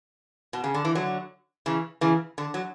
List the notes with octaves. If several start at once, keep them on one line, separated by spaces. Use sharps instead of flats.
B2
C#3
D3
E3
D3 F#3
C#3 E3
C#3 E3
D3
F#3